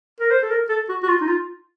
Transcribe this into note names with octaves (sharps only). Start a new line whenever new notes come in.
A#4
C5
A4
A#4
A4
F#4
F#4
F4
D#4
F4